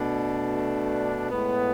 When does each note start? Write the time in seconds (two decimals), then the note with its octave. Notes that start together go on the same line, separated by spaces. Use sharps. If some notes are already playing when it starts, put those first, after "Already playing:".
Already playing: B2 A3 D4
1.30 A2 G#3 B3